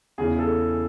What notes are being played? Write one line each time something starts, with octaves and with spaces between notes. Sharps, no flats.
E2 C#3 E3 G#4
A4